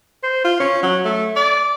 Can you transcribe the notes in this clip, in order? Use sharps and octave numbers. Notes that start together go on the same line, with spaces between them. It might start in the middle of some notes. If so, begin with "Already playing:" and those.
C5
F4
C#4
F#3
A3
D5